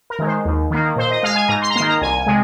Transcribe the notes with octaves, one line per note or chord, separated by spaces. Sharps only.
A#4
D#3 G#3
C5
D#2
D#3 A#3
A#2 C5
D#5
G#3 F5
G#5
G#2 A#5
C6
A#5
D#3 A#3 C6
A#5
C2 G#5
C3 G#3